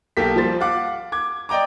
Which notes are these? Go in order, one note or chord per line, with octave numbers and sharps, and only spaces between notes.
B1 A#3 G4 A4 B6
F3 G3 C5 A6
F5 F#5 D6
D6 G#6
D5 D#5 G5 A#5 D6